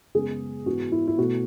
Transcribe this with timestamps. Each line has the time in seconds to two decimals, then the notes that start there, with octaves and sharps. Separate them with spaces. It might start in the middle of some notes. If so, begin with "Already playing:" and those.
0.15 F#2 C#3 G#3 B3 G#4
0.66 G#2 E3 B3 F#4
0.92 E4
1.07 E4
1.18 B2 A3 F#4